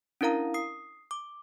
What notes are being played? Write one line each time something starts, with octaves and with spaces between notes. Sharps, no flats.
C#4 D4 E4 A#4 F5 A#5
D#6 C7
D6